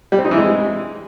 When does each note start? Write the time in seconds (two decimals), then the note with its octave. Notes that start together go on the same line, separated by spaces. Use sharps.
0.12 G3
0.18 C4
0.25 D#4
0.31 E3
0.38 G#3